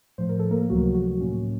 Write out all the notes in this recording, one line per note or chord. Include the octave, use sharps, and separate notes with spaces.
A2 F3 A3 C5
A#4
A4
A#3 A#4
C#2 C3 F3 F#3 A3 F#4
F#3 F#4
A2 F#3 A#3 C#4